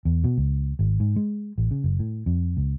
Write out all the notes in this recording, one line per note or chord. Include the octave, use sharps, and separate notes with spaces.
E2
B2
C#2
G#1
G#2
G#3
A1
C#3
F#1
A2
F2
C#2